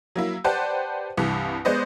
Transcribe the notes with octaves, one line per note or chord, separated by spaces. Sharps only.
F#3 A#3 E4
G4 B4 C5 D5 F#5 A5
C2 G2 E3
G#3 B3 C5 D5 D#5